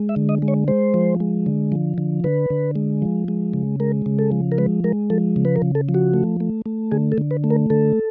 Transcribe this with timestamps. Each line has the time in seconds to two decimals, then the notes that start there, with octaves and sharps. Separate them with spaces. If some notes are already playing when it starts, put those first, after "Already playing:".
Already playing: G#3
0.09 E5
0.16 D3
0.29 D#5
0.42 G#3
0.48 C#5
0.68 G#3 C5
0.94 F3
1.20 G#3
1.46 D3
1.72 F3
1.98 D3
2.24 D3 B4
2.50 D3
2.76 G#3
3.02 F3
3.28 G#3
3.54 C#3
3.80 G#3 A#4
4.06 C#3
4.19 A4
4.32 F3
4.52 A#4
4.58 G#3 B4
4.84 G#3 A#4
5.10 F3 A4
5.36 C#3
5.45 B4
5.56 A#4
5.62 C#3
5.75 A4
5.89 F3
5.94 F#4
6.14 A3
6.40 A3
6.66 A3
6.91 D3 G#4
7.12 A4
7.18 D3
7.31 B4
7.44 A3
7.50 A#4
7.70 D3 A4